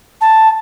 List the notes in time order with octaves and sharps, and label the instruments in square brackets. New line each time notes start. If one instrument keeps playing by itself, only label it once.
[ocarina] A5